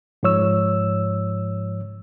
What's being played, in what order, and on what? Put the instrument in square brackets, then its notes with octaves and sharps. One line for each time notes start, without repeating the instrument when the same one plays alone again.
[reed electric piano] G#2 F3 C#5 E6